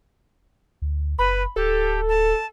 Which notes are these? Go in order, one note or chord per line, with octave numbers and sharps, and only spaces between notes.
D2
F#1 B4 B5
D1 G4 A4
A5